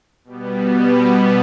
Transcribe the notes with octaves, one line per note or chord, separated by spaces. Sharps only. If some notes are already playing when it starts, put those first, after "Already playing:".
B2 G3 B3